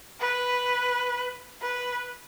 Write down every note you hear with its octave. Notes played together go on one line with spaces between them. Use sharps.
B4
B4